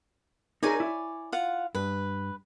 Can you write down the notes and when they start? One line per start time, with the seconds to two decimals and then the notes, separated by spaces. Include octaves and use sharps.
0.63 D#4 G#4 A#4 C#5 D5 G#5
0.80 E4
1.32 F4 F5 F#5
1.75 G2 B4